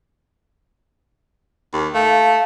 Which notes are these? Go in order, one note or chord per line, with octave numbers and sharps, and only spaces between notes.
D#2
A3 F5